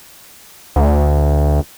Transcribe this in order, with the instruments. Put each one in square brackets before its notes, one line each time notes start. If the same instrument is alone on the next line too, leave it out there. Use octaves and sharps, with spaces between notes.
[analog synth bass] D2